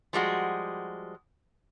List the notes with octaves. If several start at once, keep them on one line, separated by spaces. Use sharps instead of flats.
F3 G3 G#3 F#4